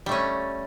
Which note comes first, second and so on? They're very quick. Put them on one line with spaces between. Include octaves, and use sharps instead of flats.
G3 A3 C#4